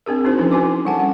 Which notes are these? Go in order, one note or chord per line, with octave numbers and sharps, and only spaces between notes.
C4 D4 G#4 A#4
D4 D#4 F#4 G#4 C5
E3 F3 C#4 D4 E4 A#4
D4 F#4 G#5 D6
G3 A4 F#5 G#5 A5
C#4 F#5